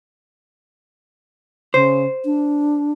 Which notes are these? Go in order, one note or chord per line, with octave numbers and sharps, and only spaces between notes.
C#3 C5
D4